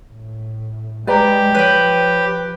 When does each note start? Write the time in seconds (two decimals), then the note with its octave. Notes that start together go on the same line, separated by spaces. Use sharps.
0.12 A2
1.07 G#3 G4 B4 D5 A#5
1.55 F3 B4 C#5 G5